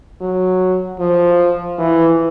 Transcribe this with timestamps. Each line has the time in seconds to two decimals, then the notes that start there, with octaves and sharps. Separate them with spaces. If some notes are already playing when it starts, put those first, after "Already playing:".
0.21 F#3
1.00 F3
1.79 E3